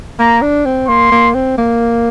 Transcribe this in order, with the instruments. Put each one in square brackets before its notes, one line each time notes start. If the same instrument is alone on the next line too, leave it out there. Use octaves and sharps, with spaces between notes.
[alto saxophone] A#3 [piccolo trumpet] A#5
[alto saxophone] D4
C4
[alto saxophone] A#3 [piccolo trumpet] C6
[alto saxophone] A#3
C4
A#3